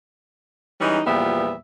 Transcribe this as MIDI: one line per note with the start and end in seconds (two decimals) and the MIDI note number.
0.80 1.00 52
0.80 1.00 55
0.80 1.00 56
0.80 1.00 61
0.80 1.00 63
1.06 1.54 40
1.06 1.54 46
1.06 1.54 53
1.06 1.54 55
1.06 1.54 59
1.06 1.54 76